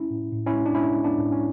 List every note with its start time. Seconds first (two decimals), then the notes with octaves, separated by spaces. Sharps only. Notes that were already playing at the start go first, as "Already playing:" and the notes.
Already playing: G#3 C#4 E4
0.10 A2
0.32 A2
0.47 C#4 E4
0.53 G#3
0.66 D4
0.75 G#3 C#4 E4
0.96 G#3
1.04 B3 D4
1.18 A2
1.32 C#4